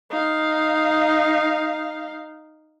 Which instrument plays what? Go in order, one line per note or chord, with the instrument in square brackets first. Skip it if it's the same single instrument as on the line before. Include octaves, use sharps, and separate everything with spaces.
[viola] D#4 F5